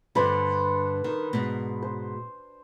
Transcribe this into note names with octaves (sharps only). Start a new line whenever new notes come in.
G2 D3 D4 B4 C5
D#3
G#2 B2
C5